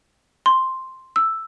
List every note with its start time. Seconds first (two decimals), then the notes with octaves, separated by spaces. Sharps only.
0.46 C6
1.16 E6